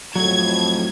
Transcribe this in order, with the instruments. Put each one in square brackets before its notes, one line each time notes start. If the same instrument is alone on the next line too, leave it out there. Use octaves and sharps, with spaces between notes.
[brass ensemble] F2 A2 [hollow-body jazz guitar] F#3 [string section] G#6